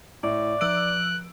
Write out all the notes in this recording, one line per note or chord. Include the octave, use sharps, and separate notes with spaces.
A2 D5
F3 E6 F#6 D7 F#7